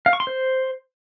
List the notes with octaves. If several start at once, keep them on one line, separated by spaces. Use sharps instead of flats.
F5
C#6
C6
C5